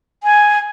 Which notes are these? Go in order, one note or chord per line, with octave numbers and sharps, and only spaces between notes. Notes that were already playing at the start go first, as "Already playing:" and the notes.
G#5